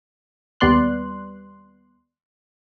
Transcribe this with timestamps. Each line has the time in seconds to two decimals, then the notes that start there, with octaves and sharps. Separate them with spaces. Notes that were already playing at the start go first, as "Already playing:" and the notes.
0.60 D#2 G3 B3 D5 C6 F#6